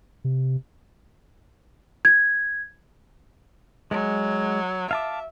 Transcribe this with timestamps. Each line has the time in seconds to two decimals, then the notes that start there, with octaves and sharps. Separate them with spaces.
0.24 C3
2.05 G#6
3.91 F#3 G#3
4.91 E5 F5 A5 D6